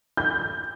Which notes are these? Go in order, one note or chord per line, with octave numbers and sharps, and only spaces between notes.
G6